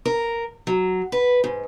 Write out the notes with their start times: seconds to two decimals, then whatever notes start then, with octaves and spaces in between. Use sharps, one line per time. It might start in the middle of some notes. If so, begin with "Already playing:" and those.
0.05 A#4
0.67 F#3
1.12 B4
1.44 G#2